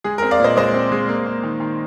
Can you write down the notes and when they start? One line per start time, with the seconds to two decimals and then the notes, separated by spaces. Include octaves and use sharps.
0.04 G#3 G#4
0.18 A#4
0.22 C4
0.31 D5 F5
0.40 A#2 C5 D#5
0.57 G#3 C5 D#5
0.74 C4
0.92 G#3
1.09 A#3
1.26 A#3
1.43 D#3
1.60 D#3